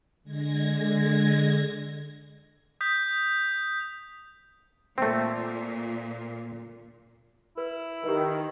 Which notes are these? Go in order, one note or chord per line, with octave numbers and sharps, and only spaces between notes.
D3 G#3 G#6 A#6
D#6 G6 B6
A#2 A3 C4
E4 B4
D#3 G4 B4